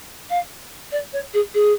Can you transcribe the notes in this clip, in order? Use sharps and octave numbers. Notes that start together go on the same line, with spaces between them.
F5
D5
C#5
G#4
G#4